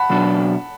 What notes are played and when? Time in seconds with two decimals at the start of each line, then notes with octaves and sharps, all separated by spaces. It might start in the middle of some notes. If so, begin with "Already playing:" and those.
Already playing: F#5 A5 B5
0.10 B2 F#3 B3 D4 F#4